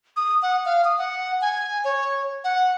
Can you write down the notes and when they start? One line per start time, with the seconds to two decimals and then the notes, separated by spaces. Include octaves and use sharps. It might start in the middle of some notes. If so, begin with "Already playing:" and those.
0.17 D#6
0.42 F#5
0.65 F5
0.85 D#6
0.98 F#5
1.41 G#5
1.85 C#5
2.44 F#5